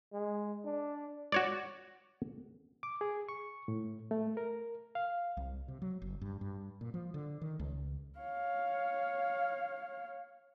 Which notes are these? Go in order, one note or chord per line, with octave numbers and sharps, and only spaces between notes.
G#3
D4
F#4 C#5 D5
D6
G#4
C#6
A2
A3
A#4
F5
C2
C3
F#3
F#1
G2
G2
A#2
F3
D3
D#3
C#2
C#5 F5